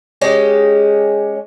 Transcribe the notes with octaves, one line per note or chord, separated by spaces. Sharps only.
G#3 C#4 G4